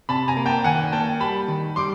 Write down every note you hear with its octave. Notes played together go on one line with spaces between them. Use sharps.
C3 A5 B5
G#5 A#5
A#3
G5 A5
D#3 F#5 G#5
A#3 G5 A5
G3 A5 B5
D#3
G3 C6 D6